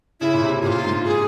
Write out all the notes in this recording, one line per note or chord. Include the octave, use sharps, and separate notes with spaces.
C#3 E4
A#2
C3
A#2 F4 G#4
G#2
G#4